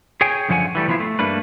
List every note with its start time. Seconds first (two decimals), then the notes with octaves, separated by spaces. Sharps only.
0.21 G#4 C#5 G5 G#5
0.49 F#2 D3 F3 C#5 F#5 G#5
0.75 E3 G3 A3
0.88 E3 F3 B3 C#4 E4 F4
1.00 A3
1.19 G2 A3 A#3 D4 B4